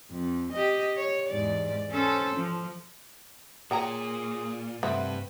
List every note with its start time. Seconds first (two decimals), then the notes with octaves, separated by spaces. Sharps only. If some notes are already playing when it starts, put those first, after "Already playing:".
0.12 F2
0.52 G4 D#5
0.97 C#5
1.29 E2 G#2 D5
1.91 C#4 A4 C5
2.36 F3
3.71 A#2 G#4 C#5 G5 A#5
4.83 C2 G2 A3 B4 C5 F#5